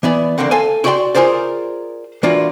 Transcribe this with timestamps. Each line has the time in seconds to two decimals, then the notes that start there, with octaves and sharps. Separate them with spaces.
0.03 E3 B3 D5
0.38 D2 D3 A#3 C4 F#5
0.51 A4 F5 G#5
0.84 E4 F#4 G4 D5 G5 C6
1.15 F4 G#4 A#4 C5 D5
2.23 E3 A#3 D4 F4 F#4 D5